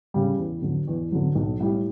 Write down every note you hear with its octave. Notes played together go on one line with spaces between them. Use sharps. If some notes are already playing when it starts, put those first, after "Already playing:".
C#3 G3
E2
D3 F#3
E2
D3 F#3
B1
A2 G3